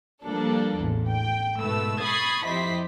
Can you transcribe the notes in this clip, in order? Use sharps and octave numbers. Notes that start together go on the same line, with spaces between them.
F3 G3 A#3 D4 A4
A1 E2
G5
G#2 B2 A3 B4 E6
B5 C#6 D#6 G#6 A6 C7
F2 E4 G4 C5 D#5 B6